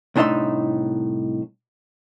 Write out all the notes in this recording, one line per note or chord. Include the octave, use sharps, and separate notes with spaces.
C2 A2 D4 D#4 E5 C6